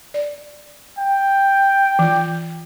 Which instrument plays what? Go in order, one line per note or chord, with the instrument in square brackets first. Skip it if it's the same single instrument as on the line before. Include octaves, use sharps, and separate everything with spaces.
[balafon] D5
[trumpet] G5
[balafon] E3 F4